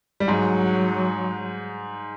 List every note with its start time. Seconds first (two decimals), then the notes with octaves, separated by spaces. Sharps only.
0.20 G3
0.28 G#2 F#3 G#3